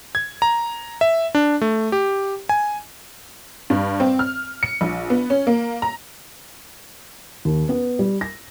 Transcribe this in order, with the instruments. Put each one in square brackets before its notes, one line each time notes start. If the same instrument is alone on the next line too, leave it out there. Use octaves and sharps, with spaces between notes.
[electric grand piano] G#6
A#5
E5
D4
A3
G4
G#5
[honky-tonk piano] G2
C4
F6
C#7
A#1
B3
C#4
A#3
A#5
[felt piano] D#2
B3
G3
A#6